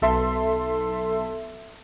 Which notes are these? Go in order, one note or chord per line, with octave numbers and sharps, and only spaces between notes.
B1 A4 E5 C6